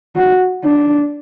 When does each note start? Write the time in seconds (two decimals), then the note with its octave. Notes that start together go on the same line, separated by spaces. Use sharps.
0.16 F#4
0.65 D4